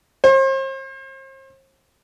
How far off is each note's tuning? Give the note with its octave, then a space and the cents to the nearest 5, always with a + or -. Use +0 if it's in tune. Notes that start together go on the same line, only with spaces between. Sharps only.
C5 +40